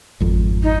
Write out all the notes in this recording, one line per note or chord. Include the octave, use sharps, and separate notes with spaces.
G#1 F2
D#4